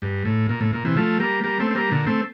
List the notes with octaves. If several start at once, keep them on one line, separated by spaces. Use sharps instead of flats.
G2
A2
A#2
A2
A#2
C3 E3
F3 A3
G3 A#3
G3 A#3
A3 C4
C4
G3 A#3
A#2 D3
A3 C4